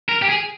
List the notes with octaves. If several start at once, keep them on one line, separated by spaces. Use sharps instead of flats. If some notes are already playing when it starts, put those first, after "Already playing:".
A#4
G4
G#4